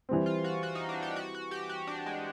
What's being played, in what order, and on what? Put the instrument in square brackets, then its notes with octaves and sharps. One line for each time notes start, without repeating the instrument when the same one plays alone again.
[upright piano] E3 G3 C4
[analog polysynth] F4
F#4
F#4
D#4
D4
G4
F#4
F#4
G4
F#4
D4
G#3